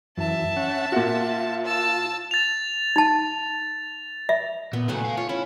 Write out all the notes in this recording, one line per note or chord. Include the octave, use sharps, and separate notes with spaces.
F#2 E3 E5 A5
C#4 F#5
A#2 F4 F#4
A5 E6
A6 F7
D#4 A5
E5
A#2 B3
C#3 F#3 A3 F#5 G#5
B4 F5
F4 C#5
C#4 E4